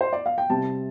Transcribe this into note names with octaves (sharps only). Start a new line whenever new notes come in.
C5
D5
F5
G5
C3 G3 C4 A5